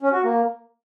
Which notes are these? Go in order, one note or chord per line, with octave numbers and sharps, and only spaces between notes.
C#4
F#4
A#3